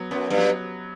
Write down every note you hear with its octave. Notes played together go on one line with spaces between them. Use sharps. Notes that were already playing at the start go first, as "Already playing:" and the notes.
Already playing: F#3 B3
F#2 B3
G2
F#3